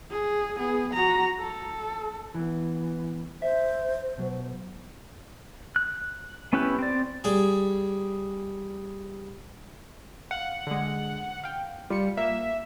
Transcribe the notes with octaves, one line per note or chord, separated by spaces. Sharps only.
G#4
B3 G#4
F#4 A#5
A4
E3 B3
C5 E5
B2 F#3
F#6
B3 C#4 E4 G4 B4
C4 D5
G3 G#4
F5 F#5
D3 G#3
F5 G5
G3 F4 C#7
A#3 E5